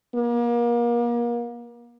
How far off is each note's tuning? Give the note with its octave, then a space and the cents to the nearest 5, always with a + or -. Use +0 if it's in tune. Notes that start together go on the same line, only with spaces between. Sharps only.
A#3 +35